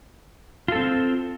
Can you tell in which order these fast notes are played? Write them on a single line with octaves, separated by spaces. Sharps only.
F4 A4 C4